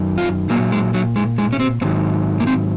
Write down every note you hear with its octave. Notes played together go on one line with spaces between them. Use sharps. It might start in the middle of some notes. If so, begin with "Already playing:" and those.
Already playing: F#2 D#3 F#3
F4
A#2 F#3 A#3
G#3
F#3
G#3
G#3
C#4
C4
G#2 D#3 F#3 C4
A#3
C4